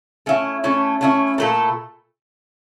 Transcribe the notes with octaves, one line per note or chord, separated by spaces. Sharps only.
A3 C#4 E4
A3 C#4 E4
A3 C#4 E4
A#2 A3 E4 A4